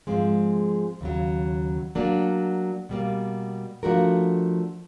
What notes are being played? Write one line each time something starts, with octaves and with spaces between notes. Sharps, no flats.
G#2 F3 G#3 C4
D#2 C#3 F#3
F#3 A#3 D4
B2 G3 A#3
F3 A3 D4 F#4 A#4